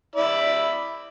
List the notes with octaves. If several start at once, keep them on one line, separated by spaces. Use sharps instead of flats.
E4 D5 B5